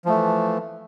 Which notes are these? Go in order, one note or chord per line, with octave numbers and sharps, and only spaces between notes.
E3 F3 A3